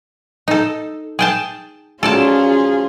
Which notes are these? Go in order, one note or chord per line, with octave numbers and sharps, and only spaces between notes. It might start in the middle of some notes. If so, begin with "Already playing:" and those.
D#4 A4
G#4 G5 A5
F3 F#3 C#4 F4 G#4 A4 D5 A5